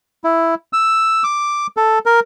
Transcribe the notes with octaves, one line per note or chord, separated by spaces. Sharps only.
E4
E6
D6
A4
A#4